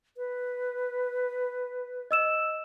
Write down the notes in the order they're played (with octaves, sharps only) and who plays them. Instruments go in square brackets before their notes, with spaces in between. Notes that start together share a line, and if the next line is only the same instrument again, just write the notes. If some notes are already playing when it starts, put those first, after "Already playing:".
[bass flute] B4
[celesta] D#5 E6 E7